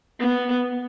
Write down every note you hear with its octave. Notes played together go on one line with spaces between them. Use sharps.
B3